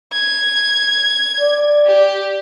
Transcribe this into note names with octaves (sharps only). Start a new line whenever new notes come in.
G#6
D5
G4